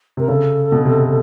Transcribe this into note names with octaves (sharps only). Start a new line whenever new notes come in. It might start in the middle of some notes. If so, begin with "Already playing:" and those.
C3 A#4
C#3 A4
B2
C3